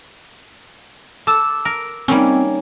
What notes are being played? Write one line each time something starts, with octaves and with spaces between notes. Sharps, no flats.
A4 A5 D6 E6 E7
A#4
D#3 G3 A#3 C4 C#4 C#5